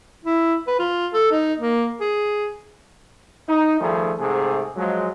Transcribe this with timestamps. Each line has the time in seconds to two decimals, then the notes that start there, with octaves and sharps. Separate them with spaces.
0.25 E4
0.68 B4
0.80 F4
1.14 A4
1.31 D#4
1.59 A#3
2.01 G#4
3.49 D#4
3.80 D#3 F3 G3 A3 G#4
4.19 G#2 C3 A3 G#4
4.77 F3 F#3 G#3